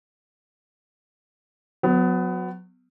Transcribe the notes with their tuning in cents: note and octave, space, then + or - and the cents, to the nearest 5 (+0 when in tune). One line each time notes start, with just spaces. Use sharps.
F#3 -25 B3 +20